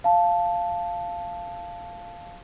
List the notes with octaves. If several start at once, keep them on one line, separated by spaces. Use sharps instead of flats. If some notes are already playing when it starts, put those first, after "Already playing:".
F5 A5